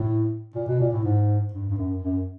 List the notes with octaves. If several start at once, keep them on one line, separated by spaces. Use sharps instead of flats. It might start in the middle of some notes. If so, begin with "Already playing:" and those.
Already playing: A2
A#2
B2
A#2
A2
G#2
G2
G2
F#2
F#2